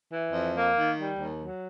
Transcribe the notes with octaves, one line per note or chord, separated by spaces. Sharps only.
E3
F2
A#3
D#3
G3
D#2
F#3